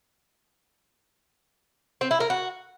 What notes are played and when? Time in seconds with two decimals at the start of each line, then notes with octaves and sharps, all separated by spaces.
2.01 C4
2.11 E4
2.20 A#4
2.30 F#4